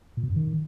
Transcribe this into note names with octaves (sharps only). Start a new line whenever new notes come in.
A#2
B2
F#2
D#3